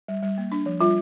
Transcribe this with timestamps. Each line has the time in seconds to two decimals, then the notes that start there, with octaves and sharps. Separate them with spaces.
0.08 G3
0.23 G3
0.38 A#3
0.52 D4
0.66 F3
0.81 G3 F4